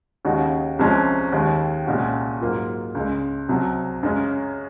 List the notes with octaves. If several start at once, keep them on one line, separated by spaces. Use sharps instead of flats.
D#2 C#3 G#3 D#4 F#4
C2 C3 F3 G#3 C#4
D#2 D#3 G#3
C2 A#2 G#3 C#4 F#4
G#2 F#3 A#3 F4
C#2 C#3 G#3
C2 C3 F#3
F#2 C#3 G#3 C#4